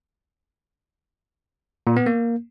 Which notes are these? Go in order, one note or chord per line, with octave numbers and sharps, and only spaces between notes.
A#2
B3
A#3